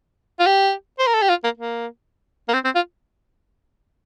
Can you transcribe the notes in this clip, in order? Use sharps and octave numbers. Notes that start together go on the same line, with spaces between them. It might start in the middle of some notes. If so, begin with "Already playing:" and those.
F4
G4
C5
A#4
A4
G4
F4
A#3
A#3
A#3
C4
C4
F4